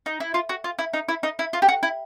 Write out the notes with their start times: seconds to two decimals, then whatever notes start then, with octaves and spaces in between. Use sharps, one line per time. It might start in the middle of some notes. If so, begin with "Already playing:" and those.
0.06 D#4
0.20 E4
0.34 F4
0.49 F#4
0.64 F4
0.79 E4
0.93 D#4
1.09 E4
1.23 D#4
1.39 E4
1.53 F4
1.62 G4
1.68 F#4
1.83 E4